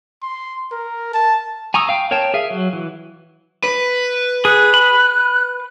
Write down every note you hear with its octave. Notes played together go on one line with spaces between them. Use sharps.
C6
A#4
A5
G#5 A#5 C#6 D#6 E6
F5 G5
A#4 C#5 G5 A5
G#4 E5 F5
F#3
E3
B4
G#4 F#6
B5